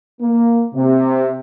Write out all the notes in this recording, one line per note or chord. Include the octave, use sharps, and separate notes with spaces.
A#3
C3